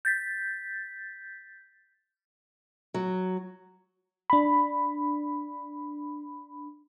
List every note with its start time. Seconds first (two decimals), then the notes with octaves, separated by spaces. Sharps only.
0.05 G6 A6 B6
2.94 F#3
4.30 D4 B5